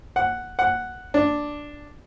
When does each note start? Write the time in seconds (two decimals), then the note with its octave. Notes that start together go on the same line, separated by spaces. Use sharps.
0.16 F#5
0.59 F#5
1.14 D4